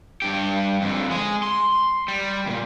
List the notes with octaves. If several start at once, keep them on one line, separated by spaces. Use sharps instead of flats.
G2 G4
F2 D3
G#3 G#4
C6
G3
D#2 A#2